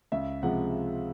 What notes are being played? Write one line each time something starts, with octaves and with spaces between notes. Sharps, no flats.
C#2 E5
C3 F3 G#3 F#5